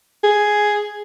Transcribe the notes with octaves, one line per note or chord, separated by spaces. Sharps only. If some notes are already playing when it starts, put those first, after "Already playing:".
G#4